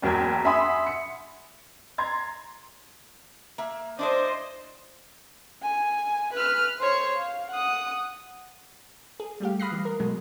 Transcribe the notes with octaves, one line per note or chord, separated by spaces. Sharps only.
F#1 E2 F#3 A#4 G5 G#6
E5 F#5 G#5 B5 C6 D#6
C#7
A#5 C6 G#6 A6
A#3 E5
D4 E4 C5 D5 D#5
G#5
B4 F6
C5 C#5
F5
F#5 D#6
G#4
G3 A3 G4 F5
B5 D#6 F6 F#6 A#6 C7
E3 G3
A#4
B2 F#3 G#3